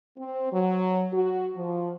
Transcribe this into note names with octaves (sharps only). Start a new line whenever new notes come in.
C4
F#3
F#4
F3